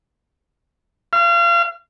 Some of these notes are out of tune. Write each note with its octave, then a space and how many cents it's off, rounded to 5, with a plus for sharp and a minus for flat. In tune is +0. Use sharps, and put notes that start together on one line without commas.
F5 -35